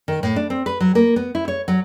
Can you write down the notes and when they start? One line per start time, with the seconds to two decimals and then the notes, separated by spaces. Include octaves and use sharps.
0.08 D#3
0.23 A2
0.36 D4
0.50 C4
0.66 B4
0.80 F#3
0.95 A#3
1.16 B3
1.35 E4
1.48 C#5
1.68 F#3